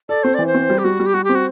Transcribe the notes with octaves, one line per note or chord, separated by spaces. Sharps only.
A4 D5
C4 C5
E3 D5
C5
C4
G3
G4
G3 F#4
G3
G4
G3 F#4
G4
C4
F#4